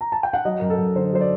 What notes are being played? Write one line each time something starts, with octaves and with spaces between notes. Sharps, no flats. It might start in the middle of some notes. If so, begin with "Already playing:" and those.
A#5
A5
G5
F#5
F#3 D#5
F#2 A#4
A4
F#2
D3 C5
F#3 C5
D5